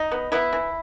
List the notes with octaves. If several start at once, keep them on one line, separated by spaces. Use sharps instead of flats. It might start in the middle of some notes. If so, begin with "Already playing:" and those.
Already playing: D#4
B3
B3 E4
E3